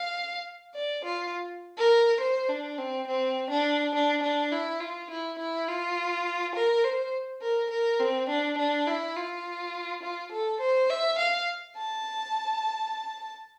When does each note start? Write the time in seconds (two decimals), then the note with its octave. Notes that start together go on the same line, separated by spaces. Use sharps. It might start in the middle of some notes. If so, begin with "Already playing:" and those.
Already playing: F5
0.75 D5
1.05 F4
1.77 A#4
2.20 C5
2.49 D4
2.78 C4
3.07 C4
3.50 D4
3.95 D4
4.23 D4
4.52 E4
4.81 F4
5.11 E4
5.39 E4
5.68 F4
6.55 A#4
6.84 C5
7.42 A#4
7.70 A#4
8.00 C4
8.29 D4
8.58 D4
8.87 E4
9.16 F4
10.02 F4
10.32 A4
10.61 C5
10.90 E5
11.18 F5
11.76 A5